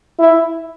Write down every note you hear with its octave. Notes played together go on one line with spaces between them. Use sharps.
E4